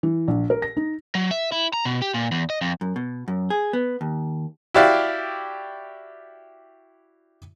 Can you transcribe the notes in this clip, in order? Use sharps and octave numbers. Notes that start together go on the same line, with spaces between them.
E3
A#1
A#4
A#6
D#4
F#3
E5
E4
A#5
B2
G4
A#2
E2
D#5
F2
F#2
B2
F#2
G#4
B3
D#2
E4 F#4 G4 D5 F5